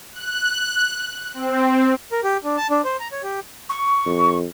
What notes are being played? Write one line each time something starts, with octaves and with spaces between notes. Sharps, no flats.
F#6
C4
A#4
G4
D4
A5
D4
C5
A#5
C#5
G4
C#6
F2